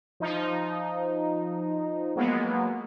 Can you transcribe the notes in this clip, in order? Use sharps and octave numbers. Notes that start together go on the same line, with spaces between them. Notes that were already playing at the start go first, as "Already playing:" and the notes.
F3 D#4
F#3 G#3 A#3 B3